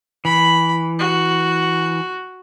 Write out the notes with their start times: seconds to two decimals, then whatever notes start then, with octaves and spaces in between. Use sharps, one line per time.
0.25 E3 B5
0.99 F#4